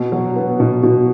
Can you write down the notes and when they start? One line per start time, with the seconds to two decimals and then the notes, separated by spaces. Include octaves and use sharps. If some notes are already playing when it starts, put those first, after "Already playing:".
Already playing: B2
0.12 F#3
0.36 B3
0.60 B2
0.83 B2